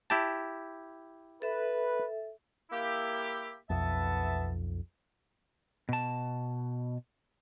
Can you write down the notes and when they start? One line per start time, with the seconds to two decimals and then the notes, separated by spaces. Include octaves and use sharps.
0.10 E4 G4 A5
1.42 A4 B4 E5
2.71 A#3 E4 G4
3.70 B1 F2 B3 E5 A5
5.89 B2 A5